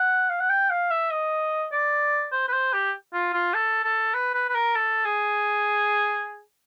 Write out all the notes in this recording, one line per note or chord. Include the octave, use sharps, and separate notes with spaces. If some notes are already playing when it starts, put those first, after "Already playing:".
Already playing: F#5
F5
F#5
G5
F5
E5
D#5
D5
C5
B4
C5
G4
F4
F4
A4
A4
B4
B4
B4
A#4
A4
G#4